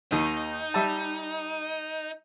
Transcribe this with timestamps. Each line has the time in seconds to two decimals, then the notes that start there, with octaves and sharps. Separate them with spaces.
0.12 D#2 D#3 D#4
0.74 G3 E5 A5